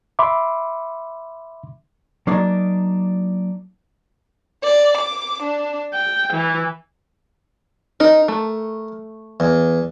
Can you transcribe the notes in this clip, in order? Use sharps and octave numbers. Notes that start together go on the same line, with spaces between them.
E5 B5 C6 D6
F#3 A#3 D4 D#4 D5
D5
D6
D4
G5
E3
D#4 A#4
A3
E2